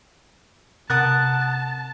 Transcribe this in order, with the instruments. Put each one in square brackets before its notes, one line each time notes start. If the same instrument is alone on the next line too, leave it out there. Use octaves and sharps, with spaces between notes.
[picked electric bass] C3 [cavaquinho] A#4 F#5 D#6 [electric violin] A5 [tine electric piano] F#6 A6